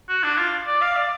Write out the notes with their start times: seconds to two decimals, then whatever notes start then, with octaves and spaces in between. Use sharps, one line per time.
0.09 F#4
0.24 D4
0.38 F4
0.67 D5
0.81 F5
0.96 D5